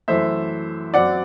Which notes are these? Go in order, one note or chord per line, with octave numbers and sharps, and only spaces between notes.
F#2 E3 A3 C5 E5
F#2 F#3 C4 D5 F#5